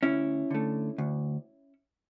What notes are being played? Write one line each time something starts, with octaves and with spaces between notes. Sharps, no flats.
D2 C#4 E4
D3 A3
D2